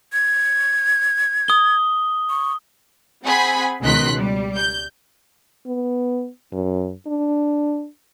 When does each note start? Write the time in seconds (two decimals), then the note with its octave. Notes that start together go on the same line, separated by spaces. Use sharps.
0.13 G#6
1.48 D#6 G7
2.29 C#6
3.23 C4 G#4 F#5 G#5 B5
3.82 C#2 B2 D#3 C6 F#6 B6
4.18 G3
4.57 G6
5.66 B3
6.52 F#2
7.06 D4